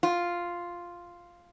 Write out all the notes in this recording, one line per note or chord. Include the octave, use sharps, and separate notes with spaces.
F4